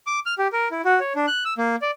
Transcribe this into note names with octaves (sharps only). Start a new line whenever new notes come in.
D6
F6
G4
A#4
E4
F#4
C#5
D4
F#6
E6
A#3
D5